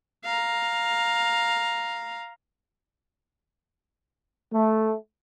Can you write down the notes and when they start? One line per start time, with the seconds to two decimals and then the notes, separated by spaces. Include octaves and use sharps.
0.24 F5 A#5
4.52 A3